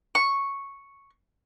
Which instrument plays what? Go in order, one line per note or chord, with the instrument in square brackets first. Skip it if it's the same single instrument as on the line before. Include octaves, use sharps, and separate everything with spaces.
[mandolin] C#6